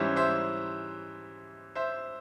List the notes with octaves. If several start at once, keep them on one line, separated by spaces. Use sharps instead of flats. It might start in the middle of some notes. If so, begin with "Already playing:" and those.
Already playing: G#2 E3 G3 C#4 C5 E5
C5 E5
C5 E5